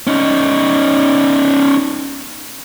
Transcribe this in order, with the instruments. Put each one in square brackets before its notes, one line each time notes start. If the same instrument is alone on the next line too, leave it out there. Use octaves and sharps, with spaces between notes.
[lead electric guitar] C#4 D#4